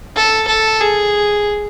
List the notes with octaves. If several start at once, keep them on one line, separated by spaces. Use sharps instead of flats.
A4
A4
G#4